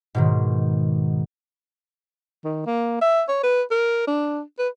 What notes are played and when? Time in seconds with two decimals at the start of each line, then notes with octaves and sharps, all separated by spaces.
0.15 G#2 B2 D#3
2.44 D#3
2.66 A#3
3.01 E5
3.28 C#5
3.44 B4
3.71 A#4
4.08 D4
4.59 B4